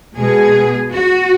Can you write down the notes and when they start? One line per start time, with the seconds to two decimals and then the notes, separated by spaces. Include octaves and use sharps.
0.16 B2 G#3 G#4
0.92 F#4